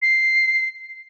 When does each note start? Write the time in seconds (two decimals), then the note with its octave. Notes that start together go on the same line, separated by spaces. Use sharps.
0.02 C7